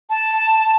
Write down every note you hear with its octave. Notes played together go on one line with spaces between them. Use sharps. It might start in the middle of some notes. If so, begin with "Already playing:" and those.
A5